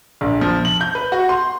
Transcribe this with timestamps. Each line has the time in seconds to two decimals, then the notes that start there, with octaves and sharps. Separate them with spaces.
0.21 A#1
0.41 F3
0.65 F#7
0.81 G6
0.95 B4
1.12 F#4
1.29 C6